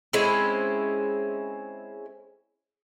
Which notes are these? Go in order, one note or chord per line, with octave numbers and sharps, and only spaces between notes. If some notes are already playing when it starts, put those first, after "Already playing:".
G#3 C4 C#4 E4